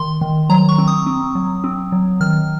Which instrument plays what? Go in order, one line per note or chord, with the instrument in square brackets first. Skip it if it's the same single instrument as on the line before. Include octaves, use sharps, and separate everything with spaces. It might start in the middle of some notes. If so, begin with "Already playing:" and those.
Already playing: [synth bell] D#3 C6
D#3
F#3 A#5
C#6
C4
D#6
C4
F#3
C4
F#3
D#3 F6